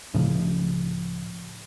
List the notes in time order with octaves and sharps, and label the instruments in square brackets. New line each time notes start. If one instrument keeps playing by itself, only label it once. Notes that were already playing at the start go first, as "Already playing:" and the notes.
[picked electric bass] C#2 A2 C#3 F3